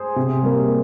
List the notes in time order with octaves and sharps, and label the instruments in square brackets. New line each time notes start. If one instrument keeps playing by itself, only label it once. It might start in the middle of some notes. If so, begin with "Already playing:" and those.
Already playing: [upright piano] G#4 C5
C3
G3 A#3